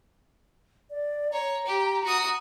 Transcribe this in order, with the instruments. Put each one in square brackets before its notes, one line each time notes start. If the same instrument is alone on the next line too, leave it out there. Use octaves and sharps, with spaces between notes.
[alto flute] D5
[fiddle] C#5 [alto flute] A#5
[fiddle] G4
F#4 D#6